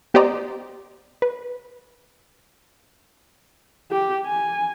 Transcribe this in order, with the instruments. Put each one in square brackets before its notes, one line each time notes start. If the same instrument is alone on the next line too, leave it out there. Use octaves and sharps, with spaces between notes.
[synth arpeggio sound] B3 G4 C5 D5 D#5 A#5
B4
[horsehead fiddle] G4
G#5